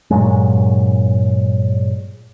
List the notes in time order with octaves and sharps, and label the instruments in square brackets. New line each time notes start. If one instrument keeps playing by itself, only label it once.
[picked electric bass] G2 A#2 F#3 G#3